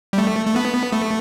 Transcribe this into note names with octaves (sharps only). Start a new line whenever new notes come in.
G3
A3
A3
B3
A3